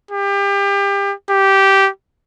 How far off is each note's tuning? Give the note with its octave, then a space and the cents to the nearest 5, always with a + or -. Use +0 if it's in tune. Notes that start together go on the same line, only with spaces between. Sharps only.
G4 +30
G4 -10